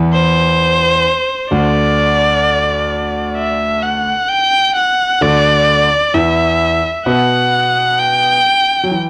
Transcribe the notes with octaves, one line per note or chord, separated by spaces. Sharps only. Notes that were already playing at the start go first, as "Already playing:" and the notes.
Already playing: E2 E3
C5
D2 D3 D5
E5
F#5
G5
F#5
D2 D3 D5
E2 E3 E5
B2 B3 F#5
G5
F#3
E3